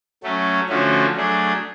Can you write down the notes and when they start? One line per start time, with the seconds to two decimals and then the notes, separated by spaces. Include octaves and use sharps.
0.23 F#3 A3 C#4
0.69 D3 F3 A3 C#4 F#4
1.15 F#3 A3 D4 G#4